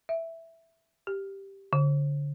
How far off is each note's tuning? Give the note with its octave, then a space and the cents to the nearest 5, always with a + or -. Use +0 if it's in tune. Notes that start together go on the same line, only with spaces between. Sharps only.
E5 +0
G4 +0
D3 -25